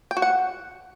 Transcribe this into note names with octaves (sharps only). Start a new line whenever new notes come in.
G5
F#4
F#5